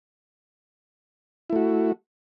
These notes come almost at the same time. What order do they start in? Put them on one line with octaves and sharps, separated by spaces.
E4 A3 F#4